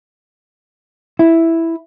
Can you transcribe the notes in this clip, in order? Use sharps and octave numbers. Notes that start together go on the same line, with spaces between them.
E4